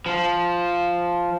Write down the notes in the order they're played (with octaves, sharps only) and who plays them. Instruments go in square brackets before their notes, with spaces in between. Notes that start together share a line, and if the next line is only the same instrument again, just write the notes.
[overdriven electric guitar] F3